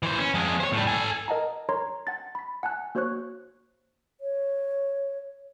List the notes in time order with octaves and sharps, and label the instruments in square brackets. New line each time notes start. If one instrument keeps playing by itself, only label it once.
[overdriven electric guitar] E3 C5
C#4
F2 G#3
C5 C#5
A2 G3
A4 G#5
[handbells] A#4 D#5 F#5 A5 A#5
A#4 C#5 A#5 C6
F#5 A5 A6
B5 B6
F#5 G#5 A5 F#6
A#3 F#4 C5 C#5 C#6 F#6
[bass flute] C#5